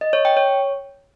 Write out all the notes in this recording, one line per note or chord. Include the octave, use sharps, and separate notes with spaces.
D#5
C#5
G5
C#5